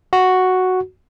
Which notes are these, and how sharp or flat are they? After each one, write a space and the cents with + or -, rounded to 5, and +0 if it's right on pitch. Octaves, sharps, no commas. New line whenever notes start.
F#4 +0